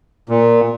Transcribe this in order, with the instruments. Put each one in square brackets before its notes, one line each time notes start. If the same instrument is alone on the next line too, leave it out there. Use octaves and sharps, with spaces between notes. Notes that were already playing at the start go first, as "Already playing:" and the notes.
[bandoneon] A#2